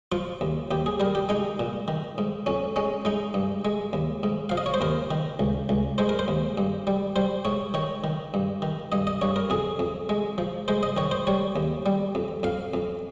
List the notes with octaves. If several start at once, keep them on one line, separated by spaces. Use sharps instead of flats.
F3 F4
D#2
D#2 G4
G#4
G3 A#4
G4
G#3 D#4
A#2
D#3
G#2
F2 C#4
G#3 C#4
G#3 D#4
G2
G#3
D#2
G#2
F3 F5
D#5
C#5
C5
D#2 A#4
D#3
C#2
C#2
G#3 C5
A#4
C5
D#2
G2
G3
G3 C5
G#2 C#5
D#3 C#5
D#3
G2
D#3
G2 D#5
D#5
G2 C#5
A#4
F2 G#4
F2
G#3
F3
G#3 C5
D#5
D#3 C#5
C5
G3 C#5
D#2
G3
F2
F2 F5
F2